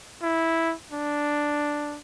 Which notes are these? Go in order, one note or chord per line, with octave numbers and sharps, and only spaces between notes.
E4
D4